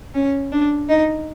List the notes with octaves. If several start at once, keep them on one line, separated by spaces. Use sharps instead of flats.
C#4
D4
D#4